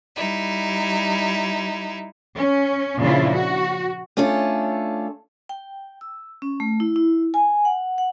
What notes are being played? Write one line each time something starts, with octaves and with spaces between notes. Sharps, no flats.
G3 D#4 E4
C#4
A#2 C#3 F3 D4 E4 F4
F#4
A3 C#4 D4 F4 A4
G5
E6
C#4
A3
E4
E4
G#5
F#5
F#5